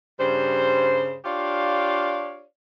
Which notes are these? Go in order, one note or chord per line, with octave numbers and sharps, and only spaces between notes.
G2 C#3 G3 C5
D4 F4 G4 C#5 D5 F5